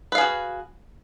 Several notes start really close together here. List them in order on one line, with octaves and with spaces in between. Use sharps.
B4 F5 G#4 F#4